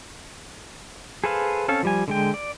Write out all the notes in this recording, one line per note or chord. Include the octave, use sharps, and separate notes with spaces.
G#4 A4 B4 C5 F5
C4 C#4 A4 F5
F3 G3 G#5
D3 G#3 G5
D5